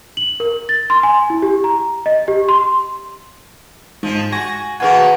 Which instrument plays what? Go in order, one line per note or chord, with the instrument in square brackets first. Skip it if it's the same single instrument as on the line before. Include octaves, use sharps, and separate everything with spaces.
[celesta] F#7
A#4
A6
C6
G#5
E4
G4
A#5
D#5
G4
C6
[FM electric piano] G#2 [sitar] F3 G#3
[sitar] F#4 [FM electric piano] G#5 A#6
[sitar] A2 D#3 A#3 [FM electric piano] F#4 G#5 [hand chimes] G#4 B4 F#5